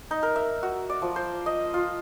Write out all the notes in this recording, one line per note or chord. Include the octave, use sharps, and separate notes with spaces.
D#4
A#4
E5
F#4
D5
F3
C5
D#5
F4